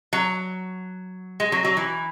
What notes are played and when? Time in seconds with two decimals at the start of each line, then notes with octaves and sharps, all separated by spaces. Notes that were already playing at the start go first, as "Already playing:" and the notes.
0.13 F#3
1.40 G#3
1.52 F#3
1.65 F#3
1.77 E3